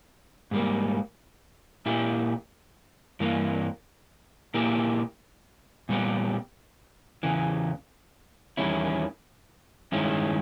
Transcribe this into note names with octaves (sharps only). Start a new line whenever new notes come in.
G#2 G3 A#3
A#2 A#3 E4 G4
G2 E3 A#3
A#2 A#3 E4 G4
A#2 G3 B3 G4
E2 C#3 E3
E2 D#3 G3 C#4 E4
G2 D#3 G#3 C#4 E4